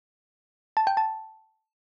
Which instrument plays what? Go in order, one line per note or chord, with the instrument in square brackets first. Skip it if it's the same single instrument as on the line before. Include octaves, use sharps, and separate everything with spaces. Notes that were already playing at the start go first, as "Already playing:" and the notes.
[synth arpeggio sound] A5
G5
A5